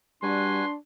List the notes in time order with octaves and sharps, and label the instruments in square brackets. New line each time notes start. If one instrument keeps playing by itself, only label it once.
[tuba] G3 [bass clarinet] D4 [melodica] F#4 B4 G#5 [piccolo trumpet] C6